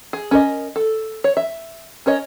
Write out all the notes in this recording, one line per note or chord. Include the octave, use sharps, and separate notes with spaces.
G#4
C#4 A#4 D#5
A4
C#5
E5
C#4 A#4 C#5 D#5